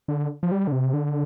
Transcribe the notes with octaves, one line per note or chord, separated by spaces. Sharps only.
D3
F3
G3
D3
C3
D3